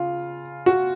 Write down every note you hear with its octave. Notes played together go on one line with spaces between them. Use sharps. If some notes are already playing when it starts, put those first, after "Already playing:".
Already playing: C#3 F4
F#4